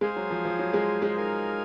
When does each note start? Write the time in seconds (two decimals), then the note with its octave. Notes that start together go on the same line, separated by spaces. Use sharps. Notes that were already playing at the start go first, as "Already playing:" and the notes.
0.01 G#3 G#4 C5 F5 G#5
0.16 F#3
0.31 F3
0.45 F3
0.59 F#3
0.74 G#3
1.02 G#3
1.16 D#4 A#4 F5 G#5